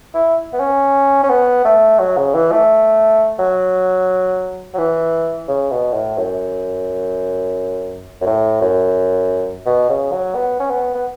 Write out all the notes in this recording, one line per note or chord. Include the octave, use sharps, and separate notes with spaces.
E4
B3
C#4
C#4
B3
A3
F#3
C#3
E3
A3
F#3
F#3
E3
C#3
B2
A2
F#2
F#2
A2
F#2
B2
C#3
F#3
B3
C#4
B3
B3